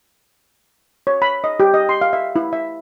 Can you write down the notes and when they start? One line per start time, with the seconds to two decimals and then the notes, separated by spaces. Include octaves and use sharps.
1.07 C#5
1.22 B5
1.44 D#5
1.60 G4
1.74 D#5
1.89 C6
2.01 F5
2.13 E5
2.36 E4
2.53 E5